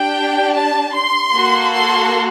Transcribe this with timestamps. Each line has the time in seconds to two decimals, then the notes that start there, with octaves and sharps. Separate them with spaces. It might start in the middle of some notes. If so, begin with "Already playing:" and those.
Already playing: D4 G4 G5
0.54 A5
0.93 C6
1.32 A#3 F#4 A4
1.72 C6